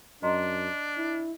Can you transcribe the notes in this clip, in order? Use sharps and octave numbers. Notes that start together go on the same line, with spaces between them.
F#2 D4 D#5 A#5 C6
E4